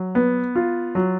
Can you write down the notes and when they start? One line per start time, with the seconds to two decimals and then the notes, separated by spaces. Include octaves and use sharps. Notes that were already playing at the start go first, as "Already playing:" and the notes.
Already playing: F#3
0.15 B3
0.56 F4
0.95 F#3